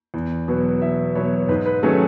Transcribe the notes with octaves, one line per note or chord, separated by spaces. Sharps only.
E2
B2 F#3 B3
E2 E5
B2 F#3 B3 C#5
G#2 B4
B4
D#3 F#3 A3 C#4 G#4